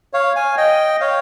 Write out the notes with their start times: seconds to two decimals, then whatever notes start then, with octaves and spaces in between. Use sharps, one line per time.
0.13 C#5 F5
0.35 F5 G#5
0.57 D#5 G5
1.00 C#5 F5